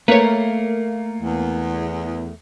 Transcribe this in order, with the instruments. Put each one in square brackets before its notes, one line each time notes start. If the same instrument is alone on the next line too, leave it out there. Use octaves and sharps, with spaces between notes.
[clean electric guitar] A3 A#4 [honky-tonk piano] A#3 [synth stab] B4 C#5
[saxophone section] E2